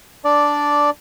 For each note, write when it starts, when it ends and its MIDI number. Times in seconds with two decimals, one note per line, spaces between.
0.25 0.90 62
0.25 0.90 74